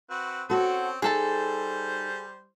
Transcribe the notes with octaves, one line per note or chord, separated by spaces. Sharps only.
C4 F#4 B4
C4 C#4 F#4 A4 C5
G3 D#4 G#4 A4 C5 A5